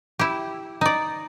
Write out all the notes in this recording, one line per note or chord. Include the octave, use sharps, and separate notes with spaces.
E4 G4
D#4 D5